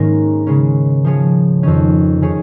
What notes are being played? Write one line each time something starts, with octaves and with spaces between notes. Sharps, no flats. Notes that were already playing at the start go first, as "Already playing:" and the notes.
Already playing: G#2 D#3 G#3 A#3 C#4 G#4 A#4
C#3 G#3 C#4
F3 C#4 G#4 C#5
F2 D#3 C#4
D#3 C#4 G#4 C#5